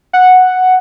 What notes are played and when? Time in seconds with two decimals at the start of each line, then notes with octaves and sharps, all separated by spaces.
0.13 F#5